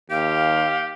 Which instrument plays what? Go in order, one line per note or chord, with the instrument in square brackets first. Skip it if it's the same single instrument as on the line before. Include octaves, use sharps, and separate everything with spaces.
[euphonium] D#2 [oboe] G4 [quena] F5